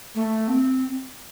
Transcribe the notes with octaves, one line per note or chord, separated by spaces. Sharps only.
A3
C4